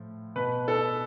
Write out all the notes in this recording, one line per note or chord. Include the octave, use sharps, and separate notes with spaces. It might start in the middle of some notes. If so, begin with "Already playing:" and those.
Already playing: A2 F3
B2 B4
A4